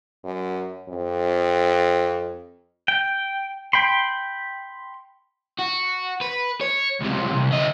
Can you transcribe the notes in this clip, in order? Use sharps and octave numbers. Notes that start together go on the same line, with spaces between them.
F#2
F2
G5
G5 B5 C6
F#4
B4
C#5
C#2 C3
C2
D2 D#5